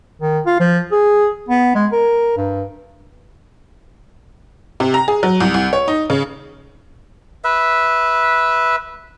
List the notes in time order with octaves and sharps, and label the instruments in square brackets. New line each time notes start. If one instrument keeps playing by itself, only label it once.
[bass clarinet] D#3
F4
F3
G#4
B3
G#3
A#4
G2
[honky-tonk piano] C3
A#5
G#4
F#3
C2
C2
C#5
D#4
C#3
[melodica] B4 E5